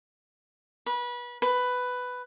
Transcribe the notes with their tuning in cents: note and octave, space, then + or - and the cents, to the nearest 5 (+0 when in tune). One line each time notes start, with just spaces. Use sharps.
B4 -25
B4 +10